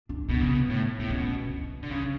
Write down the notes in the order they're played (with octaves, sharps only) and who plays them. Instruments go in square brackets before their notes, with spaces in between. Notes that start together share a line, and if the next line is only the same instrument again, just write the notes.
[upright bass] D4
[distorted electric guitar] B2 [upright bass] B3
[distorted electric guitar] C#3
B2
A2
[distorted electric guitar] A2 [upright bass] B3
[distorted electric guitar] B2 [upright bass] C#4
[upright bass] D4
[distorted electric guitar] D3
[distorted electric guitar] C#3 [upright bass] C#4